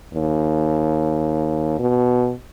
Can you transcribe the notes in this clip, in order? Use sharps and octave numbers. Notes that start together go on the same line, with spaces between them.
D#2
B2